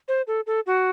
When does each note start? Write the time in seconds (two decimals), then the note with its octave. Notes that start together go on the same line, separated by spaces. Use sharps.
0.08 C5
0.27 A4
0.47 A4
0.66 F#4